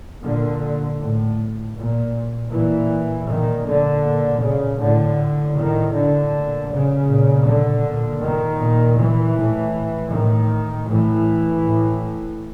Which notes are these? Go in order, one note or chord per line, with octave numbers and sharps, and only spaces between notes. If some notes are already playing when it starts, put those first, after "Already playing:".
A#2 D3
A2
A#2
A#2 E3
A#2 D#3
D3
A#2
C#3
A2 D3
A2 D#3
D3
A#2
C#3
A#2
D3
A#2
D#3
A#2
E3
A2
A2 D#3
A2 E3
A2